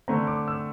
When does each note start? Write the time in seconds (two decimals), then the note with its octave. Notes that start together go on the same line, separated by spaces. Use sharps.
0.08 D3 A3 C4 A#5
0.27 D6
0.48 E6